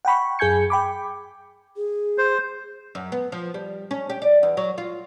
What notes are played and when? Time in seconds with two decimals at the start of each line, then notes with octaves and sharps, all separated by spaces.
0.05 F#5 G5 B5 C#6
0.39 F#2 G#4 G#5 G6 G#6 C#7
0.70 G5 B5 D6
1.77 G#4
2.18 C5
2.95 F#2
3.12 B3
3.32 F3
3.54 G3
3.91 C#4
4.10 G4
4.22 D5
4.43 E2
4.57 F#3
4.78 F4